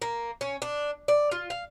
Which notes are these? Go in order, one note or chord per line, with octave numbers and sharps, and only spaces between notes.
A#3
C#4
D4
D5
F4
F5